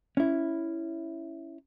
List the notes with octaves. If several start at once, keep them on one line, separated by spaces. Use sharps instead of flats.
C#4 E4